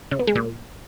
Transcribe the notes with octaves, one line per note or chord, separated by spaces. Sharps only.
C#3
B3
G#3
A#2